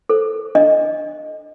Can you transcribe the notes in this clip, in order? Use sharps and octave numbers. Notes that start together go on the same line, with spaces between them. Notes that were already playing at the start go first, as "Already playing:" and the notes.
A4 C5
D4 D#5